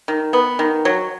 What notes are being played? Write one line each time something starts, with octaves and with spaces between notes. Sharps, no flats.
D#3
B3
D#3
F#3